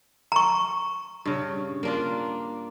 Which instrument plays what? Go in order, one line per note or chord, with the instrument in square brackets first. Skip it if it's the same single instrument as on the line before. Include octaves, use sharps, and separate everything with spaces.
[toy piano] A#5 C#6
[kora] G2 C#3
A#3 D4 F4